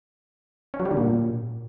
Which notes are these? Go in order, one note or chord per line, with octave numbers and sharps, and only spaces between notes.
C#4
F#3
G3
D3
A#2